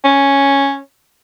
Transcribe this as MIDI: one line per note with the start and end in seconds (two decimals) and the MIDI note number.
0.04 0.77 61